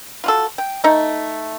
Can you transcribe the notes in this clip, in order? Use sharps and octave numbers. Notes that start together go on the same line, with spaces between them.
F4 F#4 A4
G5
A3 D#4